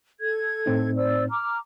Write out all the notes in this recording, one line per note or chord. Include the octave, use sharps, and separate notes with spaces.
A4 G#6
A2 C4 D#4
C5 D5 E6
A#5 D6 F6